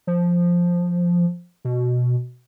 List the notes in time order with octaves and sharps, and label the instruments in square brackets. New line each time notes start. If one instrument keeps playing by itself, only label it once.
[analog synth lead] F3
B2